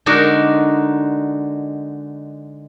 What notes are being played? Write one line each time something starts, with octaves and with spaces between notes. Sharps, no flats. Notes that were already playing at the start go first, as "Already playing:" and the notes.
D3 G#3 D4 D#4 F#4 A#4